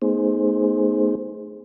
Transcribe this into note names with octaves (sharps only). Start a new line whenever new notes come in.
A3 B3 D#4 G#4 C5